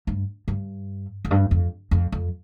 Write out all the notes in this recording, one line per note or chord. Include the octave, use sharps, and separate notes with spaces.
G2
G2
F2
G2
F2
F2
F2